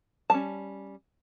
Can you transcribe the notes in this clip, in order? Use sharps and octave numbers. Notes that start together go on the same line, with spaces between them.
G3 C#4 A5